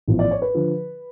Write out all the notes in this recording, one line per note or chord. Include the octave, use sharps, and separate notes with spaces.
A1 A2 F3 B3
D5
C#5
B4
D3 F3